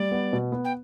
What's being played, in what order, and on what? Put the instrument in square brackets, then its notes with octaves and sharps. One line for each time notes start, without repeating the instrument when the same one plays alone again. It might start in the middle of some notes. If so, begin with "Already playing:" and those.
Already playing: [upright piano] G3 [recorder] D5
[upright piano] B3
B2
B3
[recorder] G5